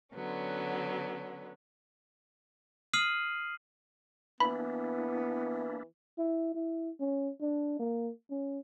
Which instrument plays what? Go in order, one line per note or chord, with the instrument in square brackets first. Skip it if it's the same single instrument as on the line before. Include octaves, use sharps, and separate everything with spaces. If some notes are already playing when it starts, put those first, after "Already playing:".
[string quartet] D3 F#3 B3 C#4
[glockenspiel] D#6 F6 C7 D#7 F#7
[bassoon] E3 [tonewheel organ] A#3 D4 E4 [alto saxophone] B3 [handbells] B5
[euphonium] E4
E4
C#4
D4
A#3
C#4